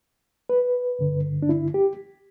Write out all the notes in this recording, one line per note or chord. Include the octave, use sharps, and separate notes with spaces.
B4
G2 D3
D4
E4
G4